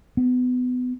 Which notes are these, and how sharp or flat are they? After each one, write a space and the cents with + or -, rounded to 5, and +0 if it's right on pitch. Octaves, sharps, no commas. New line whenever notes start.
B3 +25